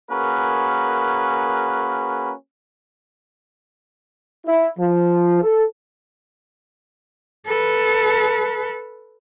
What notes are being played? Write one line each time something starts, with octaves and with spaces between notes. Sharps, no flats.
A#3 C#4 F#4 G#4 A#4 B4
E4
F3
A4
A4 B4